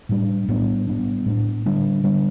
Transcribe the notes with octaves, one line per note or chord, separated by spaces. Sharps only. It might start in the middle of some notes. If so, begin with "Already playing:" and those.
A2 G3 B3 D4
A2 G3 B3 D4
A2 G3 B3 D4
A2 G3 B3 D4
D3 G3 D4
D3 G3 D4